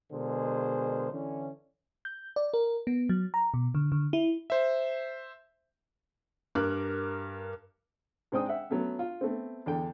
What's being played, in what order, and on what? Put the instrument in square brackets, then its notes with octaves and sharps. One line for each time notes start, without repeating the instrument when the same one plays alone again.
[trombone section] B2 D3 G#3 G#4 A#4 C5
D3 E3 C#4
[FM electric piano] G6
D5
A#4
B3
F#3
A#5
B2
D3
D3
E4
[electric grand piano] C5 E5
[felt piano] G2 A#4 D6 F#6
[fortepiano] G#2 G#3 C4 D4 G5 D#6
E5 F#5 G5
F#3 A3 B3 C#4
F4
A3 B3 C4
E2 D3 G5